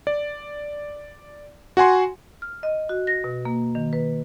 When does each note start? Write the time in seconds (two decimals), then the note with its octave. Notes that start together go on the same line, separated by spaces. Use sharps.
0.07 D5
1.77 F#4 F#5 G#5 C6
2.42 F6
2.63 D#5
2.89 F#4
3.07 A#6
3.24 B2
3.45 A#3
3.75 D#3
3.93 B4